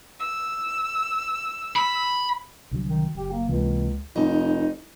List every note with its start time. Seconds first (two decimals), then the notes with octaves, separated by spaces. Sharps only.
0.19 E6
1.76 B5
2.71 C2 D3 F#3
2.87 D#3
3.15 F#1 G4
3.31 A#3
3.48 C#2 C3 E3 A#3
4.16 F1 D#4